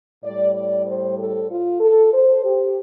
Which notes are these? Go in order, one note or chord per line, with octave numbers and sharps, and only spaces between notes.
A2 G3 D5
D5
C5
A4
F4
A4
C5
G4